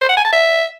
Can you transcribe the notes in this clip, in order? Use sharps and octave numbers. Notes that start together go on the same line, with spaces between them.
C5
F#5
G#5
A5
E5